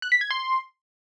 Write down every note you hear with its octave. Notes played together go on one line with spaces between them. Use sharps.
F#6
B6
G#6
C6